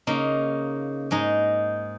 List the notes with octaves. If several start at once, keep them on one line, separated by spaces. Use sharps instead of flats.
C#3 A#3 D#4
G#2 G#3 D#4